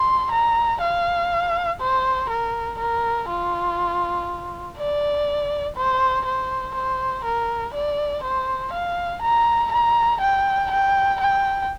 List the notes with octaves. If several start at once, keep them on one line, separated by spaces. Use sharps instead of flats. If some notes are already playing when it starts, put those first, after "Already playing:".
Already playing: C6
A#5
F5
C5
A#4
A#4
F4
D5
C5
C5
C5
A#4
D5
C5
F5
A#5
A#5
G5
G5
G5